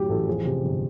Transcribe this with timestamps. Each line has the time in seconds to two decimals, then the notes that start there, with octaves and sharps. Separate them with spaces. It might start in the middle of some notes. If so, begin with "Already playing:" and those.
Already playing: F#1 A2 F#3 G4
0.09 A1 A4
0.28 F2 G#4
0.45 C3
0.64 G1